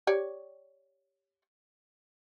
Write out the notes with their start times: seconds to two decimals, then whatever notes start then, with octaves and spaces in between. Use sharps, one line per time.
0.07 G4 C#5 D5